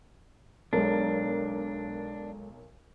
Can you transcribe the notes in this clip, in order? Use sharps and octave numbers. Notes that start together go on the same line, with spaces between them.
B1 G#3 D4 A4 A#4